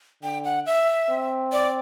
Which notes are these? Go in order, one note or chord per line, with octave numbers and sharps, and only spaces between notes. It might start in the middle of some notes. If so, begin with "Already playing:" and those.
D3 G5
F#5
E5
C4
D5